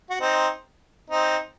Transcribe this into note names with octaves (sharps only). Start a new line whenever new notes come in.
F#4
C4 D#4
C4 D#4